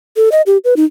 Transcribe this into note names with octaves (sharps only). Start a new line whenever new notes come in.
A4
D#5
G4
B4
D#4